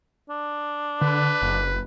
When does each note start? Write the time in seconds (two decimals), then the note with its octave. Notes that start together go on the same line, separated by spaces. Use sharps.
0.29 D4
1.01 D3 B4
1.42 F#1